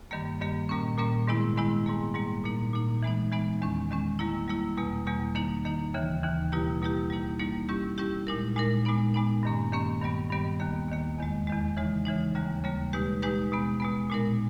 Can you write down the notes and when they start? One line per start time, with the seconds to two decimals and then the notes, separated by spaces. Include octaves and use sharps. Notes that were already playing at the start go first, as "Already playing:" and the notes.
0.11 G2 D#3 G3 A#3
0.40 G2 D#3 G3 A#3
0.69 A#2 G3 A#3 C#4
0.98 A#2 G3 A#3 C#4
1.28 G#2 D#3 G#3 B3 E4
1.57 G#2 D#3 G#3 B3 E4
1.86 G#2 G3 A#3
2.15 G#2 G3 A#3
2.44 A#2 A#3 D#4
2.73 A#2 A#3 D#4
3.03 E3 G#3 B3 D#4
3.32 E3 G#3 B3 D#4
3.61 E2 D#3 G#3 C#4
3.90 E2 D#3 G#3 C#4
4.19 G3 A#3 E4
4.48 G3 A#3 E4
4.77 E2 B2 G3 A#3
5.07 E2 B2 G3 A#3
5.35 D#3 A#3 D#4
5.65 D#3 A#3 D#4
5.94 D#2 C#3 E3
6.23 D#2 C#3 E3
6.52 B2 G3 A#3 E4 G4
6.81 B2 G3 A#3 E4 G4
7.10 G3 A#3 D#4
7.40 G3 A#3 D#4
7.69 G3 C#4 E4 G4
7.98 G3 C#4 E4 G4
8.27 A#2 G#3 D#4 A#4
8.56 A#2 G#3 D#4 A#4
8.85 A#2 G#3 B3 D#4
9.14 A#2 G#3 B3 D#4
9.43 G2 D#3 A#3 C#4
9.72 G2 D#3 A#3 C#4
10.02 G2 D#3 G3 B3
10.30 G2 D#3 G3 B3
10.60 D#2 D#3 A#3
10.89 D#2 D#3 A#3
11.18 E2 D#3 G#3
11.47 E2 D#3 G#3
11.77 C#3 E3 G#3 D#4
12.05 C#3 E3 G#3 D#4
12.35 D#2 C#3 G3 A#3
12.64 D#2 C#3 G3 A#3
12.93 B2 G#3 D#4 G4 B4
13.22 B2 G#3 D#4 G4 B4
13.52 B2 G#3 B3
13.80 B2 G#3 B3
14.10 A#2 G#3 D#4 A#4